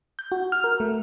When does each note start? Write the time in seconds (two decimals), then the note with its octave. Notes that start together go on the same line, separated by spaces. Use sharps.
0.19 G6
0.32 F#4
0.52 F6
0.64 A#4
0.80 A3